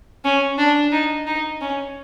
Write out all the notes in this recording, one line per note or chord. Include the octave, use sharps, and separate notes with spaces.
C#4
D4
D#4
D#4
C#4